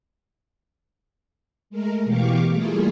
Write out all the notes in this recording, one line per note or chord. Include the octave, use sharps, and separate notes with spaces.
G#3 A3 A#4
B2 E3 G4 F5 C#6 D6
G3 A3 A#3 E4 F4 G#4